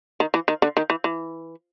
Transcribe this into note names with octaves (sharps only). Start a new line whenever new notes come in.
D#3
E3
D#3
D3
D#3
E3
E3